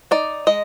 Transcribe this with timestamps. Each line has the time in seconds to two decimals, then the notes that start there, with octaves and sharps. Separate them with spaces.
0.11 D#4 D5
0.47 G#3 D#5